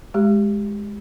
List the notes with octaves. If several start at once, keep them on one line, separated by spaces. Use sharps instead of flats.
G#3 G4